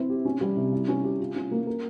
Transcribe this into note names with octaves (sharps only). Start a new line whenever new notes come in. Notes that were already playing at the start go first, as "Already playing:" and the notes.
Already playing: C4 E4
G4
C#4
G3
C3
E4
C#4
G4
F4
C#4
A#3
A#4